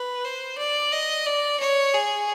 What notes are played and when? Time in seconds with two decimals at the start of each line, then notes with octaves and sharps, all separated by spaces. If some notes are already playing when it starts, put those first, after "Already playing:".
Already playing: B4
0.24 C5
0.58 D5
0.92 D#5
1.26 D5
1.60 C#5
1.94 G#4